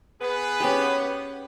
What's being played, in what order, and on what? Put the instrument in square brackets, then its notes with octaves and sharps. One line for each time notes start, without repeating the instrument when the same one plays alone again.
[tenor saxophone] B3 [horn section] G#4 B4
[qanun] C#4 G4